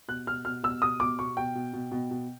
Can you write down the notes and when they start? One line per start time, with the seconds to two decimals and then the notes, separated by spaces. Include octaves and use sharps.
0.08 B2 F#6
0.27 B2 F6
0.45 B2 F6
0.63 B2 E6
0.82 B2 D#6
1.00 B2 D6
1.19 B2 C#6
1.37 B2 G5
1.55 B2
1.73 B2
1.91 B2
2.11 B2